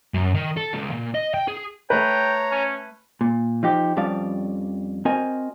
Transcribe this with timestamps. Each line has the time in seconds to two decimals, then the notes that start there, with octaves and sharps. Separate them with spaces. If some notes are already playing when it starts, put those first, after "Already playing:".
0.14 F#2
0.35 D#3
0.57 A4
0.74 C#2
0.92 A#2
1.15 D#5
1.34 G5
1.48 G#4
1.90 A3 B4 C#5 G5 A#5
2.52 C#4
3.21 A#2
3.63 F3 D#4 G4
3.97 F2 F3 G3 C#4 D5 F5
5.05 C4 F#4 A#4 D#5 G#5